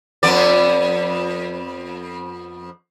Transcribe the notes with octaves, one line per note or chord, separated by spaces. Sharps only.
F2 B3 D5